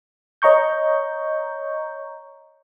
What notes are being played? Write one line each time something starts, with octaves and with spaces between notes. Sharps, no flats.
C#5 D#5 A#5 C#6 G6